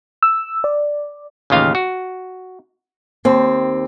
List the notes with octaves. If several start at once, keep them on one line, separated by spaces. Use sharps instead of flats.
E6
D5
A1 D#2 C#3 F4 F5
F#4
D#2 C4